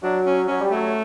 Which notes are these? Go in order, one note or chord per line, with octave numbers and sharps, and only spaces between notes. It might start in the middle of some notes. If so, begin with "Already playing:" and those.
F#3 D4
C#4
F#3 C#4
G3
F#3 A3